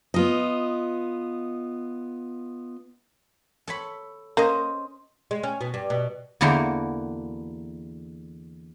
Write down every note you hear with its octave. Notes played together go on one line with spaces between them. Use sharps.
B3 F4 D#5
A4 C#5 B5
A#3 C#4 C5 D#5
G#3
C#4
B2
G2
B2
E2 D3 E3 A#3 F#4 G5